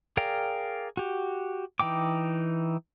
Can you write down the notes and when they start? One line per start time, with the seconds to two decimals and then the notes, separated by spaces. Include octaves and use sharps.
0.17 G#4 A#4 D5 F5 G5
0.97 F#4 G4
1.80 E3 D#4 G5 D6